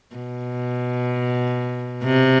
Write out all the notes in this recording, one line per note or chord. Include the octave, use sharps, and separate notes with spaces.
B2
C3